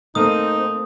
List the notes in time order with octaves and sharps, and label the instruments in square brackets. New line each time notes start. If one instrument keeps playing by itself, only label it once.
[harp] A3 A#3 D#7 [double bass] C4 [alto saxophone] D#4 [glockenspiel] D#6